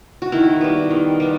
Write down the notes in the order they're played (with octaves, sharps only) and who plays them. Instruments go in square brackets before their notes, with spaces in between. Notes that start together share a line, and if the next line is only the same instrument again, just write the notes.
[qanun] F#4
D#3 E4
G3 B3
D#3
G3 B3